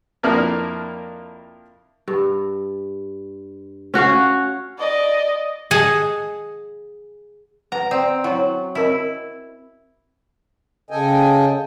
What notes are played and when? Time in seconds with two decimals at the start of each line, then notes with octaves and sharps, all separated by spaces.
0.23 F2 A#3 D4 E4 A#4 F6
2.08 G2
3.94 C#4 F#4 C#5 F5
4.79 D5 D#5
5.71 G#4 D#5 F#5 G#5 A5
7.72 B4 F#5 A#5
7.91 C4 D5
8.24 F#3 E4 C#5
8.75 C4 E4 A#4 D#5
10.90 C#3 A4 D#5 G5 G#5